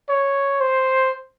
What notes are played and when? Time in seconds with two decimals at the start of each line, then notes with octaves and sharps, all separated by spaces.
0.09 C#5
0.60 C5